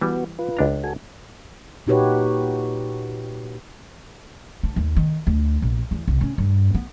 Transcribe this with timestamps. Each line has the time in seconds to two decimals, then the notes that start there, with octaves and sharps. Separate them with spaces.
0.01 E3 G3 B3 F#4
0.39 F4 B4
0.57 C#2 D4 A#5
0.84 F#4 A4 G#5
1.87 A#2 D#4 F#4 G4 B4 C#5
4.63 D4
4.76 D#2
4.96 D#3
5.27 D2
5.62 A#1
5.91 E2
6.08 C2
6.21 C#4
6.38 G2
6.75 B3